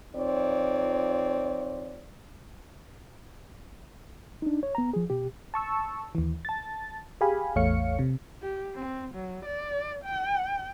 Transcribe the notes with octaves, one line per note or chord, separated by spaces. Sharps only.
F2 C4 D#4 F4 C#5 D5
D4 D#4
C#5
B3 A#5
F3 G#4
B2 G4
A5 C#6 E6
D#2 E3
A5 A6
G4 G#4 F5 G#5 B5
A1 E2 A3 C#5 F5 C#7
C3
G4
C4
F#3
D5
G5